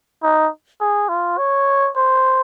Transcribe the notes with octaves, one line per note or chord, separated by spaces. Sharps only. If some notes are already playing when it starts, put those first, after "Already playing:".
D#4
G#4
F4
C#5
C5